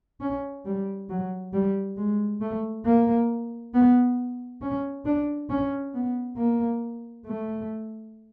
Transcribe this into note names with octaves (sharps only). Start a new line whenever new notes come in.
C#4
G3
F#3
G3
G#3
A3
A#3
B3
C#4
D4
C#4
B3
A#3
A3